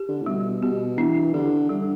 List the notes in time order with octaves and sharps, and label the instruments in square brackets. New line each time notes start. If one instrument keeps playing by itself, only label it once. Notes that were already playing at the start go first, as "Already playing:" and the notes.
Already playing: [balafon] G4
[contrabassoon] D3
A2
[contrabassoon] B2 [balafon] G3
[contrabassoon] B2 [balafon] G4
[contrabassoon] E3 [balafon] D4
[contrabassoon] D3 [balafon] G4
[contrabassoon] D3 [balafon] G3